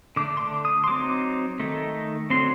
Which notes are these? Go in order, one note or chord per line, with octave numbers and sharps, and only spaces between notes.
D3 A3 D4 D6
C6
D6
D#6
C6
F#3 C4 D#4 D6
D#3 A3 D#4
D3 F#3 C4 C6